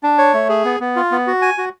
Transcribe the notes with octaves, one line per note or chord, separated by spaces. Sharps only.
D4
C#5
A3
G#4
B3
B3
F4
B3
F#4
G#5
F#4